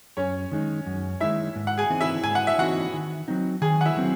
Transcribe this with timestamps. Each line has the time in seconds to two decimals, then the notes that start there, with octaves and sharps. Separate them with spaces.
0.17 F#2 C#4 C#5
0.52 D#3 G#3 D#4
0.86 F#2
1.20 D#3 G#3 D#4 E4 E5
1.56 G#2
1.67 F#5
1.78 G#4 G#5
1.90 E3 C4 D#4
2.01 E4 E5
2.24 G#2 G#5
2.35 F#5
2.47 E5
2.58 E3 C4 D#4 F#4 F#5
2.93 D#3
3.28 F#3 C4 D#4
3.62 D#3 G#4 G#5
3.81 F#5
3.86 E4 E5
3.97 F#3 C4